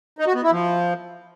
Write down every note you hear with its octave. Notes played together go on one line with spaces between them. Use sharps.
D#4
F#4
B3
E4
F3